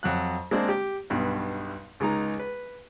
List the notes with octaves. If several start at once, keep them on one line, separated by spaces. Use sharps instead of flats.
F2 F#3 F#6
G#3 A#3 C4 D4
G4
B1 G2 B2
C#2 G#3 D#4 A#5
B4